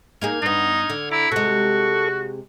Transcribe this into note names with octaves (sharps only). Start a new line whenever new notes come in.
A#3 D#4 G#4 F6 G#6
G2 B3 D#4
D3
E4 A#5 D6
C3 G#3 F#4 A4 C#6